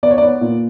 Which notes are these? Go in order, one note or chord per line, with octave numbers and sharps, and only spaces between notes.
B3 D5
C#5
B3 D5
A#2